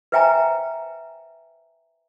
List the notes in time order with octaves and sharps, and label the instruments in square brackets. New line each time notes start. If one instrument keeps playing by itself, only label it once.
[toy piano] B4 C5 E5 G5 G#5 A#5